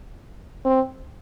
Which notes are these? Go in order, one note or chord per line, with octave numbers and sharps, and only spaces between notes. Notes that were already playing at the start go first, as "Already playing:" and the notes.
C4